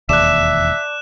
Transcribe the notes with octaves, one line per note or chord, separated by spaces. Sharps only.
E1 D#2 D5 E5 A5 D6 F#6 E7